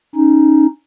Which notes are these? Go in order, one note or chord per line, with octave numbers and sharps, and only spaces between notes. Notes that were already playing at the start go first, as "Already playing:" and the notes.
C#4 D#4